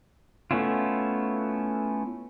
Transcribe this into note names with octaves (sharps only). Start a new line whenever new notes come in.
A3 B3 C#4 E4 F4